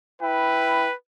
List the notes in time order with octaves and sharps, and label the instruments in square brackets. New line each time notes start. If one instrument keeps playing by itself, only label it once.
[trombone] E4 [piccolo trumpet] B4 [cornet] G5